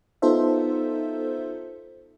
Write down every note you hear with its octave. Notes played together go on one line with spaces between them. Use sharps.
B3 D#4 F4 A4 C5 E5